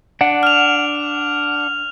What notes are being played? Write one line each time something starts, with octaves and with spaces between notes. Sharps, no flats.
D4 F#5
F6 F7